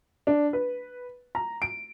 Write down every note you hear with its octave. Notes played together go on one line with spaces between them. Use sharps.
D4
B4
A#5
D7